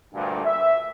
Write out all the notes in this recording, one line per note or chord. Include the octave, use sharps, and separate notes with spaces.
D2 G2 A#2
E5